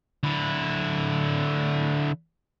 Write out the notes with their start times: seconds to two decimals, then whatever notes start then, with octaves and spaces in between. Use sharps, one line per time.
0.24 D3 E4